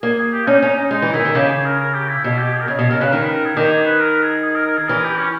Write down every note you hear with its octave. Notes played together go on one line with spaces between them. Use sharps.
A#3 G#4
G#4
G4
C#4 D#4
C#4 D#4
D#4
G#3 D#4
E3
D#3 E4
D#3
C#3 G4
G#4
A#4
A#4
G4
E4
B2 E4
G4
G#4
A#4
C#3 G#4
B2 G#4
C#3 A#4
C#3 B4
D#3 A#4
B4
A#4
G#4
D#3 G4
G#4
B4
A#4
G#4
G#4
A#4
A#4
G#4
E3 A#4
G4
C#4